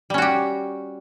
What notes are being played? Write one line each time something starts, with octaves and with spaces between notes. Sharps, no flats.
G3 C#4 F#4 G4